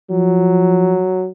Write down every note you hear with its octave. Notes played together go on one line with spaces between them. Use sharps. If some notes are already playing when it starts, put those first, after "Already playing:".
F3 F#3